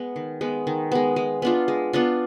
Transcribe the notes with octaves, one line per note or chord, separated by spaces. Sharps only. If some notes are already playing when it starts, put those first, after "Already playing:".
Already playing: G#3 B3
D#3
G#3 B3
D#3
G#3 B3
G#3
B3 D4 F4
G#3
B3 D4 F4